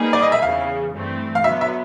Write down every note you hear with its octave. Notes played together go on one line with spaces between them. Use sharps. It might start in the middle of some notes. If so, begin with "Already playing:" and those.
Already playing: G3 A#3 D#4 G#4 B4
D5
D#5
E5
E2 C#3 E3 F5
G2 E3 A3 C4
F5
D3 F#3 B3 E5
E5